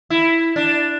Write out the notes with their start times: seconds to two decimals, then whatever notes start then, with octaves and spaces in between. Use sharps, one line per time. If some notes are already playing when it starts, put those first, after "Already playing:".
0.10 E4
0.56 D4